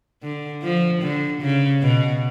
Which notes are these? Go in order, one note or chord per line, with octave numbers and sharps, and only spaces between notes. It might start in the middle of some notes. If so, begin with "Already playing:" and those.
D3
F3
D3
C#3
B2